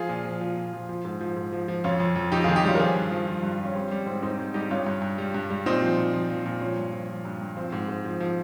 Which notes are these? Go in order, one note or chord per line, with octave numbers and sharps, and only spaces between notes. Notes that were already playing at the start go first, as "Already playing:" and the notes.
Already playing: F3 F4 G#4
A#2
F3
F3
A#2
F3
F3
G#2
F3
G#2
F3
F3
F2 C#4 F4
F2
F2
F2 D#4 G4
D#3 F4 G#4
D#4 G4
G3 C#4 F4
A#4
F3 F4 G#4
G2
F3
F3
G2
F3
C#4
G3 C4
G3 C#4
G#2 C4
G#2 C4 D#4
G#2
G3 D#4 G4
G2 C#4 F4
G2
G2
G3
G2
G3
A#2 C4 D#4
F3
A#2
F3
F3
A#2
F3 C#4
G2
F3
F3
G2
G2
F3 C4
G#2
G#2
F3
F3